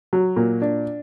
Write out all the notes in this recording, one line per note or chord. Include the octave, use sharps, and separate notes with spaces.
F#3
A#2
D4